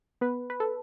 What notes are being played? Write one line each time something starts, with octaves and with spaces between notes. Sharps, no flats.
B3 B4
B4
A4